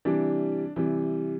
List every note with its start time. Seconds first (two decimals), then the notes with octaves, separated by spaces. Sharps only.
0.05 C3 E3 G3 D4
0.76 C3 E3 G3